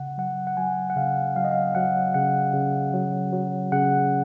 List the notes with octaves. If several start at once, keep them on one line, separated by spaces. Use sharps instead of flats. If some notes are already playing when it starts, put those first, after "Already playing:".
Already playing: C#3 F#5
F#3 F#5
F#5
F#3 G#5
F#5
C#3 F5
F#3 F5
D#5
F5
F#3 F#5
C#3 F#5
C#3
F#3
F#3
C#3 F#5